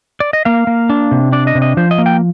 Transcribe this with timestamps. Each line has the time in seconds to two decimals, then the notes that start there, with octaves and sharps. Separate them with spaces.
0.20 D5
0.33 D#5
0.45 A#3 F5
0.67 A#3
0.90 D4
1.11 C3
1.32 D4 D5
1.47 D#5
1.55 C3
1.62 D#5
1.77 F3 C5
1.91 D#5
1.98 A#3
2.06 G5